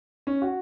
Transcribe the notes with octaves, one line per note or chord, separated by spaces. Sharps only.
C#4
F#4